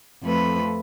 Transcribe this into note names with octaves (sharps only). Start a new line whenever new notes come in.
F2 A3 B4